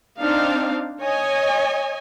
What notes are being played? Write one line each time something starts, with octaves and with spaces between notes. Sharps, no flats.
C4 D4 D#4 F5
C#5 D#5 G#5